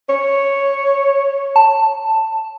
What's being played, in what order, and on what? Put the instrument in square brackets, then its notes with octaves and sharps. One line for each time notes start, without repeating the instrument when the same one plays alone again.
[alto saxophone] C#5
[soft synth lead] A5